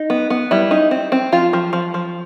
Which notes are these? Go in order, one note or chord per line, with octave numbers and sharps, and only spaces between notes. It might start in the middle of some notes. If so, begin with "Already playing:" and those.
Already playing: D#4
B3
B3
G3 E4
D#4
C4
C4
F3 F4
F3
F3
F3